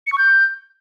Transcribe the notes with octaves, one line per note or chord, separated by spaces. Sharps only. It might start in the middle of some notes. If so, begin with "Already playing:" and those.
C#7
C#6
G6